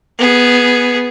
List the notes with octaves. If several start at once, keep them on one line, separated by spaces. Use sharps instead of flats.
B3 G#4